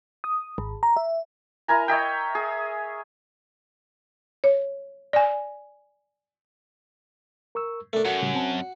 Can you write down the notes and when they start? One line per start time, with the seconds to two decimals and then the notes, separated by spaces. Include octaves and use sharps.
0.24 D#6
0.58 G#1
0.83 A#5
0.97 E5
1.68 E4 A#4 G#5 A#5
1.88 C#5 D#5 E5 G5
2.35 G#4
4.44 C#5
5.13 D5 G#5
7.55 A#4 C#6 E6
7.93 A3 D4 A4 A#4
8.05 F#2 F#4
8.22 A2 C#3 G3
8.34 C2 C4 A5